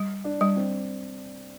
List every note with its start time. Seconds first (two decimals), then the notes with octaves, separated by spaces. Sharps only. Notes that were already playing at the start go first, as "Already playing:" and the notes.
Already playing: G3
0.24 D4
0.41 G3
0.56 C4